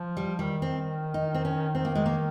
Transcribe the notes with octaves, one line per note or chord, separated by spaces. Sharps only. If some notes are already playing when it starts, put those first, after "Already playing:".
Already playing: F3
G3
D#3 G3
C4
D#4
C4
C#4
D#3 C4
A#3
G#3
A#3